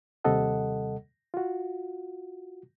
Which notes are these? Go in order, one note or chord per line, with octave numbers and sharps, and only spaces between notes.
D#2 C3 G3 A4 D#5 F#5
F4 F#4